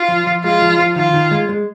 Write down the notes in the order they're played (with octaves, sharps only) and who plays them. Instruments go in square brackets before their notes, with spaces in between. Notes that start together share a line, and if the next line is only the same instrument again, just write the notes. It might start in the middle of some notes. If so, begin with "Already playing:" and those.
Already playing: [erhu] F4
[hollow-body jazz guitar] F3
F3
[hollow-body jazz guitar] G#3 [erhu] F4
[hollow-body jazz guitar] F3
F3
[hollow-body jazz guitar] D#3 [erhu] F4
[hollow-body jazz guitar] D#3
G#3
G#3